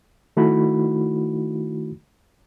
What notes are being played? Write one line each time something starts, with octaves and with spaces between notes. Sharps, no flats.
D#3 A3 D#4 E4 F#4 B5